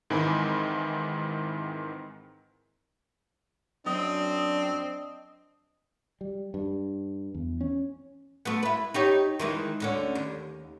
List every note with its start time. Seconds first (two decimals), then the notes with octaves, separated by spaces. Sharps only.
0.10 G#2 D#3 E3 C4 G#5 B5
3.86 F#2 C4 D4 D#5
6.21 G3
6.54 G2
7.34 E2
7.61 C#4
8.45 A3 B3
8.63 E4 B4
8.94 D#4 G4 C#5
9.39 D#3 E3 G#3
9.80 D2 D3 C#4
10.15 D#2